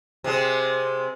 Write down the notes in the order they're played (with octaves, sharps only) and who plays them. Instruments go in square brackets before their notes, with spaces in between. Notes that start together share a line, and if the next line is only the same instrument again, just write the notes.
[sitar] C3 G#3